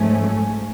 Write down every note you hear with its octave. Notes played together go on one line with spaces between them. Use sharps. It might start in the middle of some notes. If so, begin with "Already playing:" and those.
Already playing: G#2 F3 A3 C#4